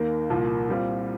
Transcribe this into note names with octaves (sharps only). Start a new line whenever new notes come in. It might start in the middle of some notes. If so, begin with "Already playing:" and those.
Already playing: D#2 D#3 A#3
C2 A#2 F3 A#3
A#2 G3 C4 F4